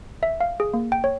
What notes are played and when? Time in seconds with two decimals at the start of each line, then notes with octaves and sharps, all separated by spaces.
0.23 E5
0.41 F5
0.60 G#4
0.74 A#3
0.92 G5
1.04 C#5